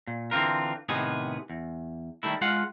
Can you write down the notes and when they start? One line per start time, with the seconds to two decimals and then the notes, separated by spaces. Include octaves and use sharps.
0.07 A#2
0.31 D3 E3 C4 F4 A#4
0.89 A2 C3 D#3 B3 G#4
1.50 E2
2.23 D#3 G3 A3 E4
2.41 G#3 F4 F5 F#5